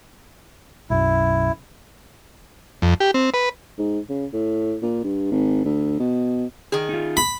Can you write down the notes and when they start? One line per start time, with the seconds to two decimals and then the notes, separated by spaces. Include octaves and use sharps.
0.90 B1 F#2 E4
2.82 F2
3.00 G4
3.14 C4
3.34 B4
3.79 G#2
4.09 C#3
4.33 A2
4.83 A#2
5.04 G2
5.32 G#1
5.65 D2
6.00 B2
6.72 D#3 G#4
6.89 D#4 F4
7.17 B5